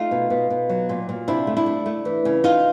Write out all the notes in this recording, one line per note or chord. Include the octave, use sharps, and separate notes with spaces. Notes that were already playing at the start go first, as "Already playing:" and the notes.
Already playing: A3 D#4 F4
B2
B2
B2
F#3
A#2
A#2
C3 D4 E4
A3
D4 E4
A3
A3
E3
C#3
C#3 D#4 F4